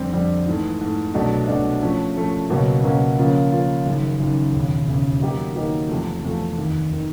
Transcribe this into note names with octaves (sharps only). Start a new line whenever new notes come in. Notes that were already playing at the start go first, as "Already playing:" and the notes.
Already playing: F2 D3 G3 C4
F2 D3 G3 C4
G#2 E3 A3
G#2 E3 A3
C2 B2 F#3 A3 D4
C2 B2 F#3 A3 D4
A#2 F3 A3 C#4
A#2 F3 A3 C#4
C#2 B2 F#3 A#3 C#4
C#2 B2 F#3 A#3 C#4
C#3 F3 A#3 C#4 F4
C#3 F3 A#3 C#4 F4
F#1 F#2 D#3
F#1 F#2 D#3
E1 D#2 C#3
E1 D#2 C#3
D#3 F#3 A#3 D#4 G4
D#3 F#3 A#3 D#4 G4
E2 C3 F3 A3
E2 C3 F3 A3
F1 D#2 D#3
D#3